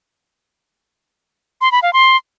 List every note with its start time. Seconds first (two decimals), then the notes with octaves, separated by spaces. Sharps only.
1.61 C6
1.72 B5
1.83 F5
1.93 C6